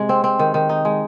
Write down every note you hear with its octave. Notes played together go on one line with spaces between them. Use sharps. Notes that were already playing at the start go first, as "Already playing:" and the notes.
Already playing: C3 G#3
C4
C4
D#3
D#3
D#4
G#3